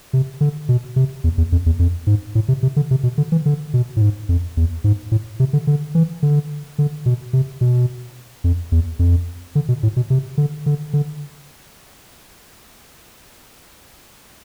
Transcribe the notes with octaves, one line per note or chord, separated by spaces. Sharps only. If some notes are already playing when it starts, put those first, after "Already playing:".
C3
D3
B2
C3
E2
E2
F2
E2
F2
G#2
A2
C3
C3
D3
C3
B2
D3
E3
D3
B2
A2
G#2
F2
E2
G#2
A2
C3
D3
D3
E3
D3
D3
B2
C3
B2
F2
E2
F2
D3
B2
A2
B2
C3
D3
D3
D3